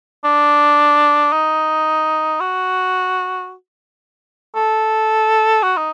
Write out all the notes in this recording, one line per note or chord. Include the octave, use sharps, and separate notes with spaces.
D4
D#4
F#4
A4
F#4
D#4